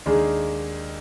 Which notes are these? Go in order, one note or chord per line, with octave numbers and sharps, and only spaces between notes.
D#2 D#3 G#3 D4 G#4